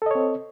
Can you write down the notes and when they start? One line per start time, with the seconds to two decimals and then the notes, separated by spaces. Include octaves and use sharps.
0.02 A4
0.06 D#5
0.11 C#5
0.15 C4